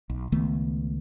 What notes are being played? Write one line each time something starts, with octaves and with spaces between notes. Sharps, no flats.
B1
C#2 D#3 A3 B3